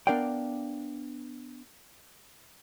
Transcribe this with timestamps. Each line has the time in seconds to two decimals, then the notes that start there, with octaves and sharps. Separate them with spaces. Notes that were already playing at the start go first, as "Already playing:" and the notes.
0.07 B3 D4 A#4 D5 F5 G5